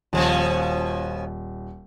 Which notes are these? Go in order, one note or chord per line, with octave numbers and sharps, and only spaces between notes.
D#1 B2 F3 C#4